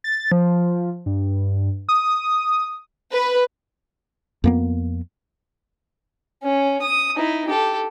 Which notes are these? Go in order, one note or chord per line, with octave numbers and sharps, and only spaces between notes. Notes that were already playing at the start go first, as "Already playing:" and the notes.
A6
F3
G2
D#6
B4
F2 A#3 B3
C#4
D#6
D#4 E4
G4 A4